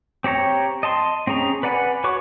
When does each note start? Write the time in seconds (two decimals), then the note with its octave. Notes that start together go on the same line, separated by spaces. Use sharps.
0.24 C4 G4 C#5 A#5
0.83 D#5 A5 C6
1.27 C4 C#4 G#4 A#5
1.63 B4 D5 F#5 G#5 B5
2.04 F#4 B4 C#5 C#6 D6